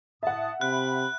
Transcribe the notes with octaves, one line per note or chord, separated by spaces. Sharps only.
A2 E5 F#5 A5 D#6
C3 B5 F#6